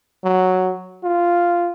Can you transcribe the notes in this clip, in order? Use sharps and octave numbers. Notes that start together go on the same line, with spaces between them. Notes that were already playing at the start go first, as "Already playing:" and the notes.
F#3
F4